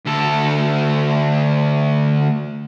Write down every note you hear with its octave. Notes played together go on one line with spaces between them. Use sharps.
D2 A4